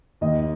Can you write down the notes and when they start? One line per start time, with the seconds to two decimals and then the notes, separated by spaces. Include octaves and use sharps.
0.21 D#2 D#5